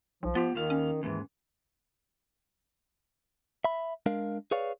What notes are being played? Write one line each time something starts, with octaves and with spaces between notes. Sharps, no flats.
B1 F3
B3 F4 G4
D#2 D#3 F5
C#4
D#2 G#2 E3
E5 B5
G#3 D4 A#4 F5
G#4 B4 C#5 D5 F5